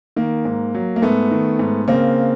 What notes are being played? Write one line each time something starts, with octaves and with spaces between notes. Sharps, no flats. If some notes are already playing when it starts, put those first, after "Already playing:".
D#3 A#3
G#2
F#3
A#3
G#2 A3 B3
D#3
G#2
C#3 A#3 C4